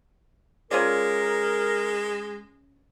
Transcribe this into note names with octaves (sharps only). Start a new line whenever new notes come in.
G#3 C#4 F4 A#4 D5